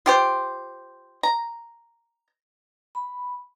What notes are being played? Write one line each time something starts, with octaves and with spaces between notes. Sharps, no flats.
F4 G4 C5
A#5
B5